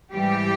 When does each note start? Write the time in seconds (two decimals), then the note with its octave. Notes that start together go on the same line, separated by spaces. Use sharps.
0.12 G#2 E3 G3 G4